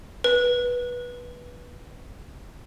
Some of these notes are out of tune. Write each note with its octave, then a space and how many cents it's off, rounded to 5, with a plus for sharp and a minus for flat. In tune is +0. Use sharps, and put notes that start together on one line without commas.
B4 -15